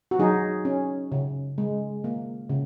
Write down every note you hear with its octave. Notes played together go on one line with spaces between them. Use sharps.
F#4
F#3 D#4 G#4
C#4
C#3
G#3
A#3
C#3